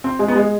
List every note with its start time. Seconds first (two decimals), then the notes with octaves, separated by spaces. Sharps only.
0.04 C4
0.19 G#3
0.28 B3
0.36 G#3